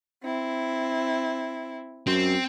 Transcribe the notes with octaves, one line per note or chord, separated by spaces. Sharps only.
C4 E4
F#2 C4